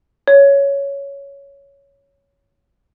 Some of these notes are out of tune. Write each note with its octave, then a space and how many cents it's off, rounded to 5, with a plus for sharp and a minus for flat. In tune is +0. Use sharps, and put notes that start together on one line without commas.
C#5 +10